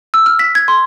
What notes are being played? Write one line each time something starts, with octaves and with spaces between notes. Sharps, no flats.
E6
F6
B6
G#6
C6